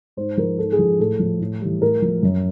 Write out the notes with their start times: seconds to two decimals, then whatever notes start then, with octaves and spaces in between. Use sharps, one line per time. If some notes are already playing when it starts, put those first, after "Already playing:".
0.17 G#2 C5
0.37 F3 A#4
0.58 G#2 A4
0.72 G#4
0.79 F3
1.00 A2 A4
1.19 F3
1.40 A2
1.61 E3 G3
1.82 A2 A#4
2.02 F3
2.23 F#2